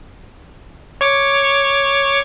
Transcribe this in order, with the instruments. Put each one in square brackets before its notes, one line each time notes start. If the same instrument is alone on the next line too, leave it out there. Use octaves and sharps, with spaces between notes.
[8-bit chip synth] C#5 C#6 D6